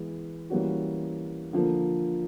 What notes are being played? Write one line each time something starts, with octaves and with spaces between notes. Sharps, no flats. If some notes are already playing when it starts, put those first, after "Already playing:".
Already playing: E3 G#3 B3
E3 G3 A#3 C#4 F#4
D3 F3 A#3